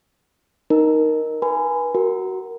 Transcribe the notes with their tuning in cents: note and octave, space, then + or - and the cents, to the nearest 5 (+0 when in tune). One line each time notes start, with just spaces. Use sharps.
D#4 +0 A#4 +5
B4 -30 G#5 +0 B5 +45
F#4 +20 A#4 +0